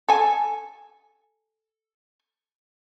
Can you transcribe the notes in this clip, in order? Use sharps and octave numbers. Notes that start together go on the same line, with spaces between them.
A4 G#5